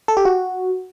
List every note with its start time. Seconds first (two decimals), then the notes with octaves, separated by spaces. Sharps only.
0.08 A4
0.17 G4
0.25 F#4